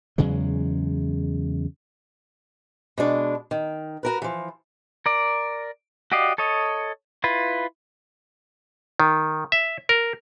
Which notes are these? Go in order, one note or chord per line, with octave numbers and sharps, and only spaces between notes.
E2 C#3 F#3 G#3
B2 G#3 D4
D#3
F#4 A#4 B4
E3 F3
A#4 D5
F#4 G4 D5 D#5 F5
A4 C#5 D#5
E4 F4 B4
D#3
E5
A#4